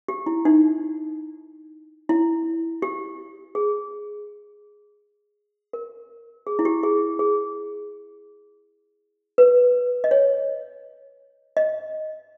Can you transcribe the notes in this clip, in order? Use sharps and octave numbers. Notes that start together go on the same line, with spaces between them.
G4
E4
D#4
E4
G4
G#4
A#4
G#4
E4
G4
G#4
G#4
B4
D#5
C#5
D#5